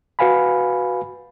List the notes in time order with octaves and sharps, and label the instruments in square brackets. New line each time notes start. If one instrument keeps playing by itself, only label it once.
[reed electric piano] F#4 B4 F5 G#5 B5